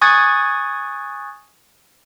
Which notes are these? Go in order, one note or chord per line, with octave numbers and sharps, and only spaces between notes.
G#5 C#6 D#6 F#6 G#6 A6